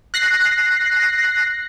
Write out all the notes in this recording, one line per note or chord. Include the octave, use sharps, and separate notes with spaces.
F#6 A#6 C7